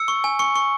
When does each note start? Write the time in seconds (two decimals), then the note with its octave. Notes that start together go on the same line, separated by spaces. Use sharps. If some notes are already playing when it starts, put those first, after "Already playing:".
Already playing: E6 C#7
0.08 C#6
0.24 G#5
0.39 C#6 C#7
0.56 C#6